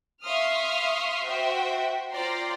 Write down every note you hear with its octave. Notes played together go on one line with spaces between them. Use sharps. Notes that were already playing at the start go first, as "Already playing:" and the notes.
E5 F5 C6 C#6 D#6 F6
F#4 C5 E5 G5
F4 C5 D5 G5 A#5 C6